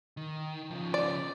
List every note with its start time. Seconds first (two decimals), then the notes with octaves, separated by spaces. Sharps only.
0.17 D#3
0.71 C#3 F3
0.94 D5